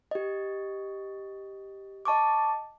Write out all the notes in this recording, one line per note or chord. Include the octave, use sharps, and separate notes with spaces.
G4 D#5
D#5 A5 C#6 D6